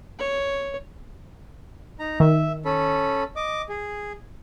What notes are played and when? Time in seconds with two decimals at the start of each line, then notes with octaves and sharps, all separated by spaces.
0.19 C#5
1.99 D#4 A#5
2.20 D#3 E5
2.65 C#4 A4 B5
3.36 D#5 D6
3.69 G#4